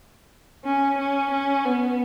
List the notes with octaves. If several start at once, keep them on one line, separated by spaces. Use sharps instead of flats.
C#4
C#4
C#4
B3